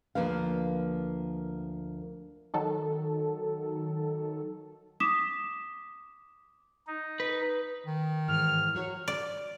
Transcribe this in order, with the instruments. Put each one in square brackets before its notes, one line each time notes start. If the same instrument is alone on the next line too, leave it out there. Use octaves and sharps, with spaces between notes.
[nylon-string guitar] D2 F3 A#3 B4 F5
[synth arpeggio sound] D#3 F#3 A4
[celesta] D6 D#6 B6 E7
[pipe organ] D#4
[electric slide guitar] B4
[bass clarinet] D#3
[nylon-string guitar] G#2 E3 [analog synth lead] F6
[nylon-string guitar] F#3 F#4 C#5
[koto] D5